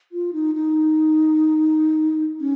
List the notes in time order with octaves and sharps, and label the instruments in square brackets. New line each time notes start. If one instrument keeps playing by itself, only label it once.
[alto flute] F4
D#4
D#4
C#4